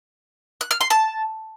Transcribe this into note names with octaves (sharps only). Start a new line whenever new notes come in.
F#6
F6
C6
A5